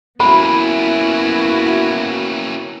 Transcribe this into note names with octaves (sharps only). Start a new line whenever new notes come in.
A#3 B3 C#4 E4 F#4 B5